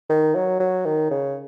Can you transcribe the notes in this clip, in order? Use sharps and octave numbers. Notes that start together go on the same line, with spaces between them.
D#3
F#3
F#3
D#3
C#3